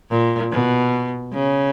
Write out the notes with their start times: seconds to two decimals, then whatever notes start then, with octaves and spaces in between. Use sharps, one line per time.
0.11 A#2
0.52 B2
1.34 C#3